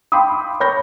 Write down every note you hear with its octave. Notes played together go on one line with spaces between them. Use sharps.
F5 G5 B5 C6 D6 D#6
C#5 B5 C#6 G6 A#6